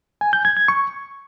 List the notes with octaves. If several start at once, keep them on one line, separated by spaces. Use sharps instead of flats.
G#5
G6
G#6
G#6
C#6